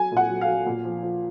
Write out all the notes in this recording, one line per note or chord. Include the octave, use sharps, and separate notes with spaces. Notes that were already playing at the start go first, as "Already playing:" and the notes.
Already playing: F#3 G#5
A#2
F#5
F#3
F5
F#3
A#2
F3
F3